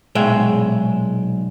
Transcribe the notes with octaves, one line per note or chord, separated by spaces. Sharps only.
B1 A#2 G#3 E5 G5